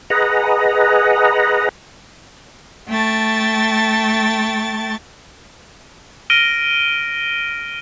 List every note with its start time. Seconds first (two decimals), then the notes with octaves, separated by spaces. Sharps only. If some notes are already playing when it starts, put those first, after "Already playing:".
0.10 G#4 B4 D#5 F#5 A#5
2.88 A3 G5 A5 C#6 A6
6.30 F6 A#6 D7 D#7 G7